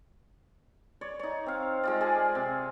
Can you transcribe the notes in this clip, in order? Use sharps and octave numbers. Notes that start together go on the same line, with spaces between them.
C#5 D5
D#4 C#5
C4 F5
G#3 F4 D5
G#4 D5 G#5 A5
C3